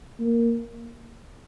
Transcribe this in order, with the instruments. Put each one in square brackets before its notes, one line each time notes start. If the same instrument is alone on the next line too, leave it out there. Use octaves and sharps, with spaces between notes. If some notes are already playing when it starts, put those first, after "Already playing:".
[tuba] A#3